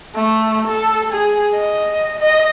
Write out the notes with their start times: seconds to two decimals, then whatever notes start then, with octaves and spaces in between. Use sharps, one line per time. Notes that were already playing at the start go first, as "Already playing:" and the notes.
0.15 A3
0.68 A4
1.12 G#4
1.55 D#5
2.19 D#5